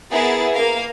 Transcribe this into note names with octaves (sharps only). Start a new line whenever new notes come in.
B3 E4 G#4 A#4 A6
A#3 A#4 F5